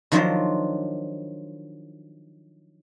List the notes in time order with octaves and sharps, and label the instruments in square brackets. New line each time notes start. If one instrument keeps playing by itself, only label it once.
[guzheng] D#3 F3 F#3 D4 F4 C5